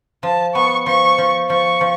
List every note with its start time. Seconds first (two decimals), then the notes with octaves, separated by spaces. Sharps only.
0.23 F3 A5
0.54 B3 C#6
0.86 F3 C#6
1.18 F3
1.49 F3 C#6
1.81 F3